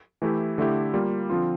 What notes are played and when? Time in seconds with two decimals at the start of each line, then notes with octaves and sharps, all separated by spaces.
0.22 E3 A3 E4 G4
0.58 D3 A3 E4 G4
0.93 G3 A#3 F4
1.30 D3 F3 C4 F4